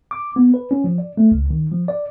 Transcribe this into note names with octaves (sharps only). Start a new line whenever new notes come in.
D6
B3
B4
C#4
F3
D5
A3
C#2
D#3
F3
D5